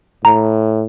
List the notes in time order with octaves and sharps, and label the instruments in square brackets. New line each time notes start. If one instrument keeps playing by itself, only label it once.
[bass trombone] A2 [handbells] A#5